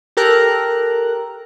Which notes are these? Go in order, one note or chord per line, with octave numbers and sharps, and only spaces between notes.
G4 A4 A#4 A#5 F#6